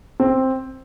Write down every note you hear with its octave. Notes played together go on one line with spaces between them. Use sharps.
C4